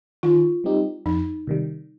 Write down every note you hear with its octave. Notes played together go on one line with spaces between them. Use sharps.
D#3 F4
G3 C4 D#4 G4
F2 D#4
C3 D#3 G3